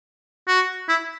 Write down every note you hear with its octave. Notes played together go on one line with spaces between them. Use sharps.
F#4
E4